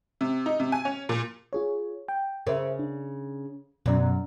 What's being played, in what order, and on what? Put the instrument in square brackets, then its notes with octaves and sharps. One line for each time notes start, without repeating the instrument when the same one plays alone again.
[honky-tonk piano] C3
D#4
C3
G#5
C#4
A#2
[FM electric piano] F4 G#4 C#5
G5
[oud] C#3 [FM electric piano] A#4 C5 E5
[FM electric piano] D4
[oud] F#2 [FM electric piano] B2 D5 A#5